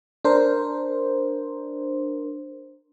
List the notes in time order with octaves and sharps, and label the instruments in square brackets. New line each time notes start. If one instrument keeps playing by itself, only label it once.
[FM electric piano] D4 A#4 C5